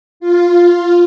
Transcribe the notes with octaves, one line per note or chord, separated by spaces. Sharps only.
F4